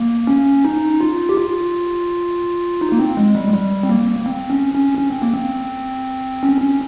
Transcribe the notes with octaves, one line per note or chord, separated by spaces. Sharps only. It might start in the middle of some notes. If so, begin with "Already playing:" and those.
Already playing: A#3
C#4
D#4
F4
G4
F4
D#4
A#3
C4
G#3
G3
G#3
G3
C4
A#3
A#3
C4
C#4
C#4
C#4
C4
A#3
C4
C#4
C#4